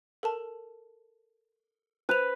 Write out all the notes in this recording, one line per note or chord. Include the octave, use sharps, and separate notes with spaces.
A4 A#4 A5
B4 C5 F7